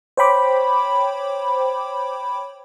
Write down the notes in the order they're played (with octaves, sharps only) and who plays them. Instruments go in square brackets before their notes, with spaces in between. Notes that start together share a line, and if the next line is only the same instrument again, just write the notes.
[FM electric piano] C5 C#5 G5 B5 D6